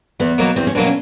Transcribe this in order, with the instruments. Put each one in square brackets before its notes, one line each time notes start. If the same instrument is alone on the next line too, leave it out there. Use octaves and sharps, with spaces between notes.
[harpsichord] E2 [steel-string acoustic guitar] B3
[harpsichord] B2 F#3 A#3
[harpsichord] E2 [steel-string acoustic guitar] C4
[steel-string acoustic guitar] C#4
[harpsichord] B2 F#3 A#3 [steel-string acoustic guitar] D4
[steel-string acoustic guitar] C#4